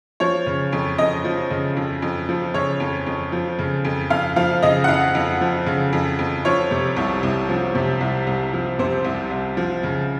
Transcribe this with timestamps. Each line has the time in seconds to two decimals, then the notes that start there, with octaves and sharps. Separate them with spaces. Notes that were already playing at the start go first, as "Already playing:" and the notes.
0.20 F3 C#5
0.46 C#3
0.73 F2
0.98 F2 D#5
1.24 F3
1.50 C#3
1.77 F2
2.02 F2
2.29 F3
2.54 C#3 C#5
2.80 F2
3.06 F2
3.32 F3
3.59 C#3
3.85 F2
4.10 F2 F5
4.36 F3 F5
4.63 C#3 D#5
4.84 F#5
4.88 F2 F5
5.15 F2
5.41 F3
5.66 C#3
5.93 F2
6.19 F2
6.45 F3 C#5
6.71 C3
6.96 C2
7.23 C2
7.49 F3
7.75 C3
8.01 C2
8.27 C2
8.53 F3
8.79 C3 C5
9.05 C2
9.31 C2
9.57 F3
9.83 C#3